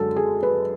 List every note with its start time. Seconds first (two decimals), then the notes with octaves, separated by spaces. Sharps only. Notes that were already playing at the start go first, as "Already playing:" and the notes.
Already playing: F#2 D3 G#3 A4
0.16 G#4
0.43 B4